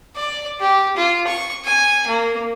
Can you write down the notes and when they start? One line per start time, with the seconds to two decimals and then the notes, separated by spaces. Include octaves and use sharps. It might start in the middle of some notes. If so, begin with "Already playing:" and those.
0.16 D5
0.60 G4
0.97 F4
1.27 C#6
1.65 G#5
2.07 A#3